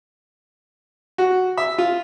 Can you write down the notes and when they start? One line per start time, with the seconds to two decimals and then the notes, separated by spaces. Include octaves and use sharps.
1.18 F#4
1.57 E5
1.78 F4